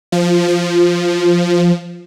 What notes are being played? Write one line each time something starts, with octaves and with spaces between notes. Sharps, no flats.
F3
F3